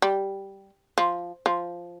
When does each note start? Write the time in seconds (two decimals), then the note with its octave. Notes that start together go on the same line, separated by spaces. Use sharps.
0.02 G3
0.98 F3
1.46 F3